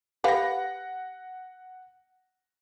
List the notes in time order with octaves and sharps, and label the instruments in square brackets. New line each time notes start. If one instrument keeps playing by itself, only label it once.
[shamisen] G4 B4 F5 [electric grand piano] F#5 A#6